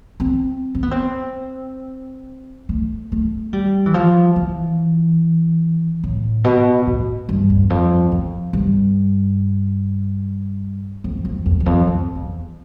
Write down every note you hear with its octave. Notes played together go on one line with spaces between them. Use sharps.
C4
C4
B3
C4
A3
A3
G3
E3
F3
E3
A2
B2
A2
G2
E2
F2
F2
G2
F2
F2
F2
E2
F2
F2
E2